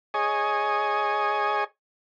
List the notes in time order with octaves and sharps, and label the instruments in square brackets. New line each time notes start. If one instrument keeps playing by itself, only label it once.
[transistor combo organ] G#4 C#5 D#5 G#5